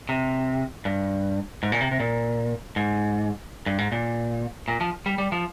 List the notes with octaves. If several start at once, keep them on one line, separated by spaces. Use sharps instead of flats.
C3
G2
G#2
A#2
C3
C3
A#2
G#2
G2
G#2
A#2
A#2
F3
G3
G3
F3